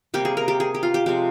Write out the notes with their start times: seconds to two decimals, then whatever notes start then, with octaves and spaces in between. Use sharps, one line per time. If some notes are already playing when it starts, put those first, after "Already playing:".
0.14 C3 G3 A#3 G4
0.25 G#4
0.37 A#4
0.48 G4
0.60 G#4
0.74 G4
0.83 F4
0.94 G4
1.06 C3 F3 G#3 G4